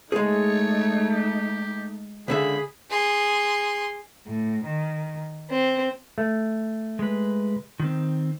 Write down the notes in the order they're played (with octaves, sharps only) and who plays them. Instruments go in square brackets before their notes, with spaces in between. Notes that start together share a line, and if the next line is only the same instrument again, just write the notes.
[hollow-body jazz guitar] G#3 G#4 [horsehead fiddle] A3 D#4 [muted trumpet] C#5
[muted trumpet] G4
[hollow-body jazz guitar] C#2 D3 E5 [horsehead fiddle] G#4 [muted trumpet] B5
[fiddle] G#4 C6
[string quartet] A2
D#3
C4
[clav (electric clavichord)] A3
[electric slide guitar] G#3 B4
D#3 C4